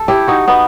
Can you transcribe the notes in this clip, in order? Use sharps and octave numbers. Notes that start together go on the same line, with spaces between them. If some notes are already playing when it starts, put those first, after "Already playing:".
Already playing: A4
E4 G4
D#4 F#4
B3 D#4